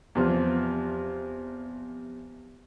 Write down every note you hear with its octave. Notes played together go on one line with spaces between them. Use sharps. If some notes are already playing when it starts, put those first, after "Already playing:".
E2 C3 F3